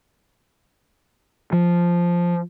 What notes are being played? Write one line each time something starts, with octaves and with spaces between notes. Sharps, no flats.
F3